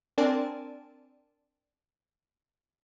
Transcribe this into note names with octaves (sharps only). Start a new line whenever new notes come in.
C4 D4 A#4 D5 G#5 A5